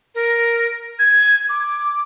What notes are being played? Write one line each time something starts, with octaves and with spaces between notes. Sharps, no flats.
A#4
G#6
D6